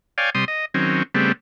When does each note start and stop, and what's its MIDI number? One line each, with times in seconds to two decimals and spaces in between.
0.18 0.30 73
0.18 0.30 74
0.18 0.30 77
0.18 0.30 79
0.18 0.30 80
0.35 0.45 48
0.35 0.45 55
0.35 0.45 84
0.35 0.45 87
0.48 0.65 75
0.74 1.03 51
0.74 1.03 54
0.74 1.03 60
0.74 1.03 61
1.15 1.32 49
1.15 1.32 55
1.15 1.32 57
1.15 1.32 59
1.15 1.32 60